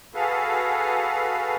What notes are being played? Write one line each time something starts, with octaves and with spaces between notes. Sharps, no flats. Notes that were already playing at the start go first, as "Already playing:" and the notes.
F#4 G#4 A4 B4 F5